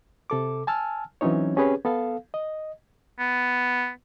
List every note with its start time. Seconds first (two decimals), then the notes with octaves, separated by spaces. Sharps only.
0.30 C3 A4 D6
0.67 G#5 A5 E6 F6
1.21 E3 F#3 C4 C#4 D#4 C#5
1.56 C4 C#4 G4 G#4 B4 C#5
1.85 B3 A4 F5
2.34 D#5
3.19 B3